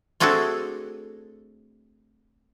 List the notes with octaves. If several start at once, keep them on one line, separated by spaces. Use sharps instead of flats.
A3 C4 D4 F#4 G#4 A4